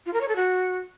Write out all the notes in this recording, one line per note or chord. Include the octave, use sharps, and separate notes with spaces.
F4
A#4
C#5
A4
F#4